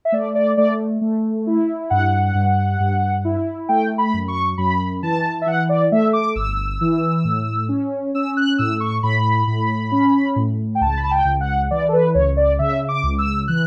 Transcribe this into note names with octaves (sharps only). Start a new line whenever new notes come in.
E5
A3 D5
D5
A3 D5
A3
E4
G2 F#5
G2
G2
E4
A3 G5
B5
F#2
C#6
F#2 B5
E3 A5
E5
E3 F#5
D5
A3 E5
D6
G1 E6
E3
A2
C#4
C#4 E6
F#6
A2 E6
C#6
A2 B5
A2
C#4
A2
G5
C#2 A5
B5
A5
G5
C#2
F#5
E3 D5
A4
B4
C#2 C#5
D5
C#3 E5
D6
C#2
E6
E3 F#6